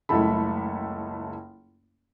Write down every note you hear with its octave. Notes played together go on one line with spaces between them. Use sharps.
F#1 C#2 A3 E4 A4 B5